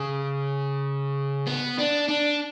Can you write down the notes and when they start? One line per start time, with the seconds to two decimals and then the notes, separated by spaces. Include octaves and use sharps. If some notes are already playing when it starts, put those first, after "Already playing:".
Already playing: C#3
1.47 B3
1.79 D4
2.09 D4